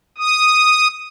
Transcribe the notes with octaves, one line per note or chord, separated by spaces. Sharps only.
D#6